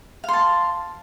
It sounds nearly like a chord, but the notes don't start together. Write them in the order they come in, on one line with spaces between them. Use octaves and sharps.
F5 C6 A5